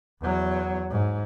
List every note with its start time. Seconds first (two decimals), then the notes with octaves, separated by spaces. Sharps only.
0.20 E2 F#3
0.90 G#2